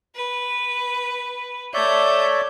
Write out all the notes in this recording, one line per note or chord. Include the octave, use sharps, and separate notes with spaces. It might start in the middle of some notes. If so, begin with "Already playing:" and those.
B4
A3 C#5 D5 E5 G6